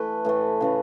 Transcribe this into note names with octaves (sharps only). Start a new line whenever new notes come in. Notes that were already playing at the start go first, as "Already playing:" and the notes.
Already playing: E3 A3 B4
A2 E3 A3
C#3 E3 A3